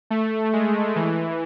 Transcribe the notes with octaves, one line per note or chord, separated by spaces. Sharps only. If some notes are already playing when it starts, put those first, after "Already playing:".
A3
G#3
E3